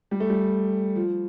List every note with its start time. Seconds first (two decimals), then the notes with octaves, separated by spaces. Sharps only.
0.11 G3
0.20 A3
0.30 G3
0.96 F3